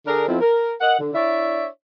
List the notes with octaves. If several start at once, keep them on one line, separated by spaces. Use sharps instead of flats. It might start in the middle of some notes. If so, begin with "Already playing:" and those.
D3 D4 G#4 A#4
F2 F3 B3 C4 E4
A#4
A#4 D#5 F#5
D3
D4 E4 C#5 D5 E5